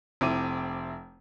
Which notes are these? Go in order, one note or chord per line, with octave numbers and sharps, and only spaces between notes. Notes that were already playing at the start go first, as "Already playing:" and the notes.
F1 C4 E4 D6 D#7